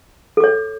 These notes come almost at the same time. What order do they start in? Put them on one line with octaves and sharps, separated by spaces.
A4 D6 C#5